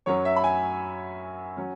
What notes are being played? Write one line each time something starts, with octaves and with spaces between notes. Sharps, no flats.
F#2 F#3 C#4 C#5
E5
B5
G#5
F#3 C#4